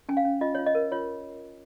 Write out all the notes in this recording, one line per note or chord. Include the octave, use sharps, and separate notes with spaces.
C#4 G#5
F5
C#4
F4 D#5
F4 C#5
D#5
A#4
F4 C#5